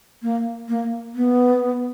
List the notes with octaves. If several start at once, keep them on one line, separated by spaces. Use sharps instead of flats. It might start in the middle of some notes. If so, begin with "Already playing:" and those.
A#3
A#3
B3